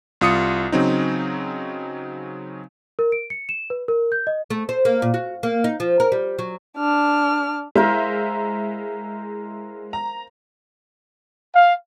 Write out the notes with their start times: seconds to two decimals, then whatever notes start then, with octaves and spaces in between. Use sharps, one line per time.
0.21 C2 F4 D#6 C#7
0.72 C#3 F#3 C4 D#4
2.99 A#4
3.12 D7
3.30 C#7
3.49 E7
3.70 B4
3.88 A#4
4.12 G6
4.27 D#5
4.50 A3
4.69 C5
4.85 A#3
5.02 A#2
5.14 F#4
5.43 A#3
5.64 D#4
5.80 F3
6.00 A#4
6.12 G3
6.39 F#3
6.78 D4 F6
7.76 G#3 E4 A#4 C5 E5 F5
9.93 A#5
11.54 F5